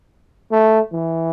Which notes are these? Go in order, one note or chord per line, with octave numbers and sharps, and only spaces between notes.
A3
E3